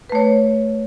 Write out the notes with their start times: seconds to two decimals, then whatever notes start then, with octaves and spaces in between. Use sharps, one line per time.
0.10 B4
0.12 A3
0.15 C#5